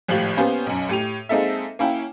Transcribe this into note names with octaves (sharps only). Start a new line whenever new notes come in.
G#1 A2 F3 G4 F#7
A#3 B3 C#4 G4 C5
B1 F#2
A2 G4 D#7 F7
G#3 A#3 C4 D#4 A4 E5
A#3 C#4 E4 G5